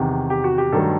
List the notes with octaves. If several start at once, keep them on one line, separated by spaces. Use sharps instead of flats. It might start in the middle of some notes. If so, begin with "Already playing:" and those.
Already playing: E2 C3 D#3
G4
F#4
G4
G2 D#3 F#3 A3 A4